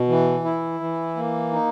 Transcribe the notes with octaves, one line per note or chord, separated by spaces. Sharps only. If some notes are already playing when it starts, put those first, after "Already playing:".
Already playing: B2
E3
E4
E3
A#3
D#4